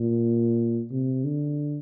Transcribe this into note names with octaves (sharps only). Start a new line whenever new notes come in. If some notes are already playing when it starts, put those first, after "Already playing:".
Already playing: A#2
C3
D3